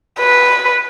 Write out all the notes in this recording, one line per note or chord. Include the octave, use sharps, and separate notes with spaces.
B4